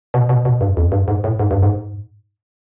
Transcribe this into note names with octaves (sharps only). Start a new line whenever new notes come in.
B2
B2
B2
G2
F2
G2
G#2
A2
G#2
G2
G#2